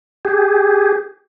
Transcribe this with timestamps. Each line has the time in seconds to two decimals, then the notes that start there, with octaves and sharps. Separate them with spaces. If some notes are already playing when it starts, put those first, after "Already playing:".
0.25 G4 G#4